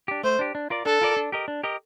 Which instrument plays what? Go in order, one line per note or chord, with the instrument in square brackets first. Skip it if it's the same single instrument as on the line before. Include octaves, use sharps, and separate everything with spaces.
[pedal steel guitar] D4 G4
[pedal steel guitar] A3 [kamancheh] C5
[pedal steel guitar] D4 G4
D4
F4 A#4 D5
[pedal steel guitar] D4 [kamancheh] A4
[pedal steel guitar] F4 A#4 D5
D4
G4 A#4 D#5
D4
G4 A#4 D#5